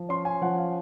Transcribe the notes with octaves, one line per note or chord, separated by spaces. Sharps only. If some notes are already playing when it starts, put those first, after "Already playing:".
Already playing: F3
C#4 C6
G#5
F3 F#5
F5